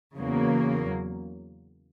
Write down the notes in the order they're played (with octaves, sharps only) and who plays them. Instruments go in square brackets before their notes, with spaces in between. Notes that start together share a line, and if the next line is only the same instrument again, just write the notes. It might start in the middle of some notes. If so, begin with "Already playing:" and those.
[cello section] E2 C#3 F#3 A#3